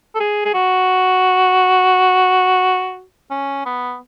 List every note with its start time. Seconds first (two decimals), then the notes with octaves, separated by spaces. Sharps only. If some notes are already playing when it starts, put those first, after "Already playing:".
0.15 A4
0.20 G#4
0.45 G#4
0.54 F#4
3.31 C#4
3.66 B3